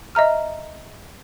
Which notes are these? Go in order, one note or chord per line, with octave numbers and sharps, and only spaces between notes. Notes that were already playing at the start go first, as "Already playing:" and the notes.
D#5 E5 A#5 F6